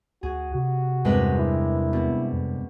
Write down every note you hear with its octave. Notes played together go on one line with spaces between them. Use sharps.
D2 F#4 G#4
C3 F#4
E2 G2 C3 G#3 C4 A#4 B4
E4
B2
F2